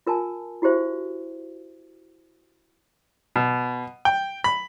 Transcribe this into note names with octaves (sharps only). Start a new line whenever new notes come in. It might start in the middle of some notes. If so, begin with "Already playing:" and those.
F4 A#4 G#5 A5
E4 F#4 G4 C5 E5
B2
G5
B5